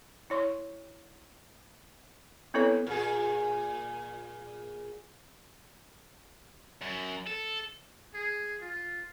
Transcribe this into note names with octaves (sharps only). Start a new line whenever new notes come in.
E4 C#5 C6 C#6
B3 C4 E4 A4 B4 C#5
A#2 G#4
F#2
A4
G#4
F4